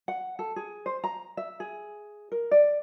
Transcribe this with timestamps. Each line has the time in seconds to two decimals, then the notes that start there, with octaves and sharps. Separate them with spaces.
0.08 F#5
0.39 A4
0.56 G#4
0.86 C5
1.04 A#5
1.37 E5
1.60 G#4
2.32 A#4
2.51 D5